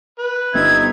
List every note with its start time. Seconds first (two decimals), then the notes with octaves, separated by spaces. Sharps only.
0.19 B4
0.54 G1 C4 D#4 E5 G#6